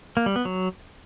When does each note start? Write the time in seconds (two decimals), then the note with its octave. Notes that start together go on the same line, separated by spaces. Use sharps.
0.17 A#3
0.26 G3
0.36 B3
0.45 F#3